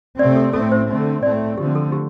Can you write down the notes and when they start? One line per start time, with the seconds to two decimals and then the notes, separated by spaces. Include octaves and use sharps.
0.19 C3 A3 C4 D5
0.36 A4
0.53 A2 A3 C4 A4
0.72 C5
0.88 D3 A3 C4
1.23 A2 A3 C4 D5
1.58 D3 F3 A3 C4 G4
1.75 A4
1.92 G4